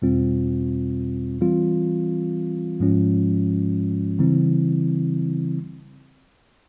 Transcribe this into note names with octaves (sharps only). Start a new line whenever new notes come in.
E2 B2 G3 C4 F4
E3 G3 C4 F4
G#2 F3 G#3 C#4 F4
C#3 E3 G3 C4 E4